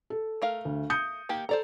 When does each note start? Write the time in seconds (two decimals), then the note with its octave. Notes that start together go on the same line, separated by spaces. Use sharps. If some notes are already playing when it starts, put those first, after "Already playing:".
0.10 A4
0.42 A3 A#4 F5
0.65 D2
0.90 D#6 G6 C#7
1.29 D#3 A#3 G4
1.49 A4 C5 D5 A#5